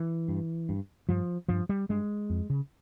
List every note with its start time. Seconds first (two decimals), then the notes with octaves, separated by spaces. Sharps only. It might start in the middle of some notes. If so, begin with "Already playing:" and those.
Already playing: E3
0.28 G2
0.69 G2
1.09 G2 F3
1.48 G2 F3
1.69 G3
1.89 G2 G#3
2.30 F2
2.50 C#3